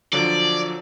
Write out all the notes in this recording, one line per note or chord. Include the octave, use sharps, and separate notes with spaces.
D3 F3 F#3 D5